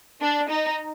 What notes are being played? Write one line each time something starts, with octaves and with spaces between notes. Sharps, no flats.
D4
D#4